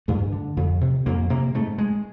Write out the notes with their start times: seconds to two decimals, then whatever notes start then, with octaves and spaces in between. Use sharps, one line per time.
0.08 G2 A3
0.32 D3
0.57 F2
0.81 C3
1.06 F2 A#3
1.30 C3 A#3
1.55 G#2 A3
1.78 G#3